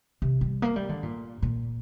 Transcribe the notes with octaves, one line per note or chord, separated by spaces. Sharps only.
C3
G3
A#3
G3
D3
A#2
A#2